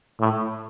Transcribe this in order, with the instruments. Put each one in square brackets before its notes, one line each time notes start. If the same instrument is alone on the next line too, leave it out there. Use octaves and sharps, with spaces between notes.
[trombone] A2